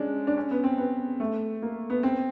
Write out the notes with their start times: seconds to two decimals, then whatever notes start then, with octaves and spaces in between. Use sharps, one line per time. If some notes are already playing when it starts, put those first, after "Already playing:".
Already playing: G#3 C#4 D4
0.27 D4
0.37 C#4
0.51 B3
0.64 C4
0.78 B3
1.20 A3
1.62 A#3
1.90 B3
2.03 C4